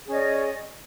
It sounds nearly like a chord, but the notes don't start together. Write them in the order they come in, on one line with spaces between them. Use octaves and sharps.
G#4 C#4 D#5 D5